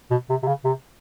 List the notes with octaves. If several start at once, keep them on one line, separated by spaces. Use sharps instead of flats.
B2
C3
C3
C#3
C3